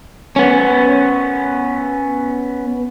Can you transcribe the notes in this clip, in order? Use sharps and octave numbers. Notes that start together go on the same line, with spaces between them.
B3 C#4